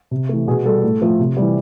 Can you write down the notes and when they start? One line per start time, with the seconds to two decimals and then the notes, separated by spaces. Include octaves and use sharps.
0.11 C3
0.29 E3 A3
0.48 B2 G#4
0.65 G3 A4
0.84 A2
1.01 F3 A3
1.19 C3
1.37 E3 G3